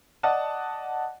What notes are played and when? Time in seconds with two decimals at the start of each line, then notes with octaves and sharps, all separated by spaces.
0.23 D5 D#5 F#5 A5